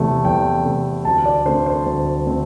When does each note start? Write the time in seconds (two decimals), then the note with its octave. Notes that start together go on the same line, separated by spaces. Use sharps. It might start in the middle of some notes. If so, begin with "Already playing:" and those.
Already playing: E2 C3 A3
0.25 E2 G5
0.65 C3 A3
1.05 D2 A5
1.26 D5
1.45 D3 A3 C4 C5
1.66 C5
1.86 D2
2.26 D3 A3 C4